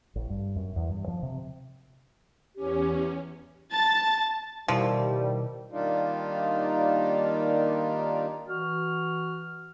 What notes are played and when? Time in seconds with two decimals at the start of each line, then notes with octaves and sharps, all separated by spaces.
0.16 A1
0.29 G2
0.56 F#2
0.76 E2
0.89 G2
1.08 F3
1.23 C3
2.56 E2 C#4 G4
3.72 A5 A6
4.68 B2 D#3 F3 G3 E4
5.71 D#3 G3 A#3 D4 D#4 F4
8.48 E3 F#4 F6